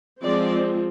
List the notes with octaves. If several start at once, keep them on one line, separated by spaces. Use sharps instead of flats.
F3 G#3 C4 D5